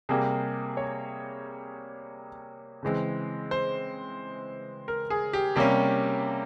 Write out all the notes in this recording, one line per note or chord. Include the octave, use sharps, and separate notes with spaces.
C3 G3 A#3 G#4
C#5
C#3 E3 G#3 C4
C5
A#4
G#4
G4
C3 G3 A#3 C#4 G4